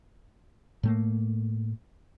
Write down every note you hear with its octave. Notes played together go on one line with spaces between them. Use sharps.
A2 A3 A#3